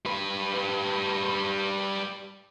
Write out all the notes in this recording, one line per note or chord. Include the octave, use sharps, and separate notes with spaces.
G3 B4